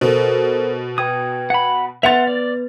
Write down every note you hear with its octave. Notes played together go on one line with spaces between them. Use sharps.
B2 A4 A#4 C5
B4 G5 D#6 G#6
F#5 B5
B3 B4 E5 F#5 C6 A6 F7
D5